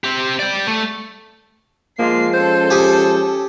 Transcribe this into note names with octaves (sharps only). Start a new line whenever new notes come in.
C4 G4
D5 G5
A3
F3 G#3 A#3 F4 C7
C#4 A4 C5
G4 G#5 D#6